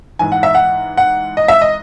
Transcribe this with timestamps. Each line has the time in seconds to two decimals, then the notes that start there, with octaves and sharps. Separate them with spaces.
0.19 G#2 E3 G#5
0.32 F#5
0.43 E5
0.55 F#5
0.97 F#5
1.37 D#5
1.48 E5
1.61 D#5